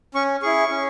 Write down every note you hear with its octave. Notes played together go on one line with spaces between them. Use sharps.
C#4 C#6
E4 G#4 C#6
C#4